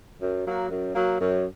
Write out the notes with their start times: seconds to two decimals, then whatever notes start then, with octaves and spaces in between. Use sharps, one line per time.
0.20 F#2
0.44 F#3 A#3 F#4
0.69 F#2
0.94 F#3 A#3 F#4
1.19 F#2